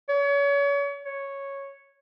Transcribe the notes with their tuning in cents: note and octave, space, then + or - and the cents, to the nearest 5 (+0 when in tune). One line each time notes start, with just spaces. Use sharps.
C#5 +35
C#5 -5